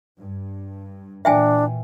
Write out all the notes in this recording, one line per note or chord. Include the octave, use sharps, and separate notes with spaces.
G2
A#2 E3 D4 E5 G5 G#5